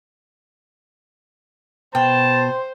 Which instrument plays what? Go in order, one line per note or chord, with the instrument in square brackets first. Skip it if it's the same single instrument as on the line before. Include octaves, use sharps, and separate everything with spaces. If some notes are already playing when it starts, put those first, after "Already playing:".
[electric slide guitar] B2 [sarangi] C5 [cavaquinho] G5 [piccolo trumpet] A5